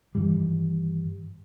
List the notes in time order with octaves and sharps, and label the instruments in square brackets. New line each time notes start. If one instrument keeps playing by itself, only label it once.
[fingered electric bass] G2 D#3 E3 G3